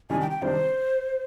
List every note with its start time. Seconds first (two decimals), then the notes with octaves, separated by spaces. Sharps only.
0.10 C3 D#3 G3 D4 G#5
0.21 G5
0.31 G5
0.42 C3 D#3 G3 D4 C5